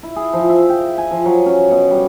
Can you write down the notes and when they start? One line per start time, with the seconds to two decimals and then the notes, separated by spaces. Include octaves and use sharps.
0.03 E4
0.16 G#4
0.33 F3
0.49 E5
0.69 G5
0.98 G#5
1.11 F3
1.26 F#3
1.46 C#4
1.71 B2
1.90 G3